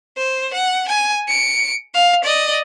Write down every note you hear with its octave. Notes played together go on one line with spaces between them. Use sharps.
C5
F#5
G#5
C#7 D7
F5
D5 D#5